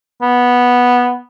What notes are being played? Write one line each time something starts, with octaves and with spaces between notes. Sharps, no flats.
B3